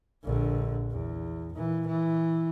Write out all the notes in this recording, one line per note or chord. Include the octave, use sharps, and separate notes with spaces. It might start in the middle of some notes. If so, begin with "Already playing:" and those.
A#1 D3
E2
A#2 E3
E3